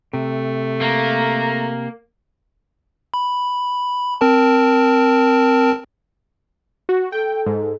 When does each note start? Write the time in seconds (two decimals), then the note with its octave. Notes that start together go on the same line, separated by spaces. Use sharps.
0.13 C3 A3
0.81 A#3 A#5
3.14 B5
4.21 C4 A#4 A5
6.89 F#4
7.12 A4 G5
7.46 G#2